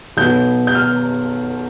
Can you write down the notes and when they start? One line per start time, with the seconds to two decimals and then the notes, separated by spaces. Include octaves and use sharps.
0.17 B1 B2 B3 G6
0.67 G6
0.75 F6